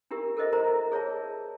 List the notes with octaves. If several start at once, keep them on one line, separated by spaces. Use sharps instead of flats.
D4 E4 G4 A#4
A4 A#4 C5 D#5 E5
E4 A#4 C5 A#5
G#4 C#5 E5 A5